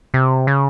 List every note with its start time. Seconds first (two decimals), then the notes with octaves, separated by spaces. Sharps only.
0.14 C3
0.47 C#3